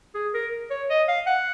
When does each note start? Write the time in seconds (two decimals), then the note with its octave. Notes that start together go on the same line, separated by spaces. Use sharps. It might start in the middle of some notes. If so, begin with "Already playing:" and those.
0.15 G#4
0.34 A#4
0.70 C#5
0.90 D#5
1.08 F5
1.27 F#5